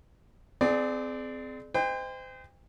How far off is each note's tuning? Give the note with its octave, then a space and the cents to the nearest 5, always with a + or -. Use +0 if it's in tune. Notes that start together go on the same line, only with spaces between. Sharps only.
C4 -25 G#4 +30 D5 +15
C5 -30 D#5 +0 G5 +35